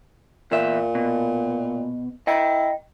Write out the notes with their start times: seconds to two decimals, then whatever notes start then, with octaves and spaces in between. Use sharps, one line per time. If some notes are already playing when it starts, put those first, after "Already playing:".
0.51 E2 A#2 E5
0.95 B2
2.27 E4 D#5 G5